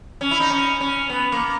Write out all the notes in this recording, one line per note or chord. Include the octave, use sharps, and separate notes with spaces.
C#4
E4
D#4
C#4
C#4
B3
A#3